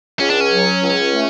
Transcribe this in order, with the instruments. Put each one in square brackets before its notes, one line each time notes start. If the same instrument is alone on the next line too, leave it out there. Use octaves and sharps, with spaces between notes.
[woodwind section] C#2 [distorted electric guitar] C#4
[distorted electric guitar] D4
C#4
[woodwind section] F#3
C#2
A3